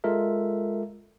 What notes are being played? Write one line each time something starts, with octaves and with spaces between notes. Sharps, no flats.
G#3 F4 A4 A#4 E5